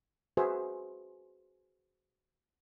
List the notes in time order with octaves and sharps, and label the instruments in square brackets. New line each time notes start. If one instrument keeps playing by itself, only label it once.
[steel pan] F#4 G#4 B4 C5 E5